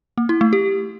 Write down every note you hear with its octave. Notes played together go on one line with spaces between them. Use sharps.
A#3
E4
A3
G4